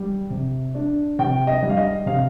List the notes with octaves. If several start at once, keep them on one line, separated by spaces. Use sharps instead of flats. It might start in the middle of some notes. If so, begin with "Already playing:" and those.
Already playing: G3
C3
D4
C3 G5
D#5
G3
F5
D#5
C3 F5